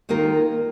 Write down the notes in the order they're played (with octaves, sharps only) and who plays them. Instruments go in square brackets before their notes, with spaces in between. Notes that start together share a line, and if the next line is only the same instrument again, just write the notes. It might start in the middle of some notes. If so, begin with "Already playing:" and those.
[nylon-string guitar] D#3 A#3 F4 A#4